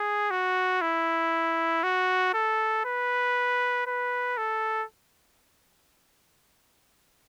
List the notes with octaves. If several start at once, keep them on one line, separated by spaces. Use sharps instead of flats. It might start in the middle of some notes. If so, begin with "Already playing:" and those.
Already playing: G#4
F#4
E4
F#4
A4
B4
B4
A4